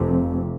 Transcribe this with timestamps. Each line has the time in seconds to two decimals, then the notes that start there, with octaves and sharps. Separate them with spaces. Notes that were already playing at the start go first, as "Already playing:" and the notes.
Already playing: F1 F2 C3